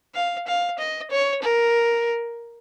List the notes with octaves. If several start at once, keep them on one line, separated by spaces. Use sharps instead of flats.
F5
F5
D#5
C#5
A#4